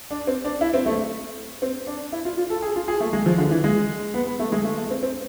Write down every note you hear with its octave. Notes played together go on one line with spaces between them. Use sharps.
D4
C4
D4
E4
C4
A3
C4
D4
E4
F4
F4
A4
G#4
F4
G#4
A3
G#3
F3
D3
E3
G#3
B3
B3
A3
G#3
A3
A3
C4
C4